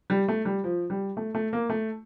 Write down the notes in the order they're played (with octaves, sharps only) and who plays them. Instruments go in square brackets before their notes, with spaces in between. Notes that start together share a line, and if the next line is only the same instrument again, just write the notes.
[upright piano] G3
A3
G3
F3
G3
A3
A3
A#3
A3